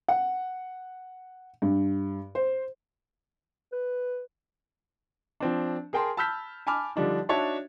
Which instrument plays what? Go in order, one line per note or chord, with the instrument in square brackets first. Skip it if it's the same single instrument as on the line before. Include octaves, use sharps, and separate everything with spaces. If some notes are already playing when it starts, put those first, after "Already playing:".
[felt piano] F#5
G2
C5
[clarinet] B4
[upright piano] F3 C4 D4
G#4 A#4 G5 A5 C6
A5 B5 E6 F6 G6 B6
G#5 A5 B5 D6 F6
D3 F3 G3 D4 D#4
D4 D#4 F#4 C#5 E5 A5